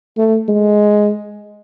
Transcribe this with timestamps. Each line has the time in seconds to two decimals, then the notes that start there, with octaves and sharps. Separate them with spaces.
0.17 A3
0.48 G#3